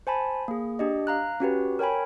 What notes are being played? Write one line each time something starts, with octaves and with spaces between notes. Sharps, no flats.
C5 G#5 A5 B5
A#3 G#4
D4 G4 D#5
F5 A#5 F#6
C#4 F#4 G4 B4
A#4 C#5 G5 G#5 B5